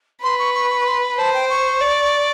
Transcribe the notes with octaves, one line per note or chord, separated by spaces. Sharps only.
B4 C6
C#6
C#6
C#6
C#6
C6
B5
C5 A5
G5
C#6
D5